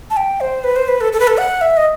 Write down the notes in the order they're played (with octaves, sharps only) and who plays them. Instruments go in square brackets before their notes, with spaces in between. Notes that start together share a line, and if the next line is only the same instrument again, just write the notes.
[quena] A5
G5
C5
B4
C5
B4
A4
A4
B4
A4
F#5
E5
D#5